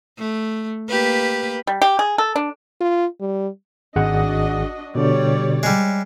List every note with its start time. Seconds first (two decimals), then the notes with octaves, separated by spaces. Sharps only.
0.18 A3
0.89 A#3 G4 B4
1.67 G3
1.82 G4
1.99 G#4
2.18 A4
2.36 D4
2.81 F4
3.21 G3
3.96 G#1 D4 F#4 G#4 D#5 F#5
4.95 B2 D3 G3 C#5 D5
5.63 G3 G#3